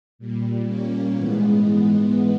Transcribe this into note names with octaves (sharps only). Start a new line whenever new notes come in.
A#2 G3
A#3 C#4
G#2 E3 G#3 B3